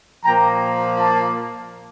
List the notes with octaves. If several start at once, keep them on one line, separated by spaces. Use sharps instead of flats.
A#2 F3 A#3 G5 A#5
F5 A5